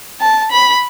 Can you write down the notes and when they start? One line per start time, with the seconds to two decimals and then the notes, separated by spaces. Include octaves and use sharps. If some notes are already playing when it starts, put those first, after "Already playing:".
0.21 A5
0.52 B5